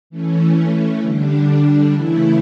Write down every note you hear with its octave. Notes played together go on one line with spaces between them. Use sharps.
E3 A3 C#4
D3 G3 D4
C#3 E3 A3 E4